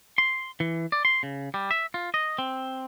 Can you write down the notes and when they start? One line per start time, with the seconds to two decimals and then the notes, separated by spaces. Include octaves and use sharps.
0.18 C6
0.60 E3
0.92 D5
1.05 C6
1.23 C#3
1.54 G3
1.71 E5
1.94 F4
2.14 D#5
2.38 C4